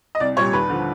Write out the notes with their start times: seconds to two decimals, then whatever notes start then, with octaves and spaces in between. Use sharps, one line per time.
0.15 D#5
0.20 C2 D5
0.36 A#2 G3 C#5
0.53 D#2 B4
0.69 D3 F3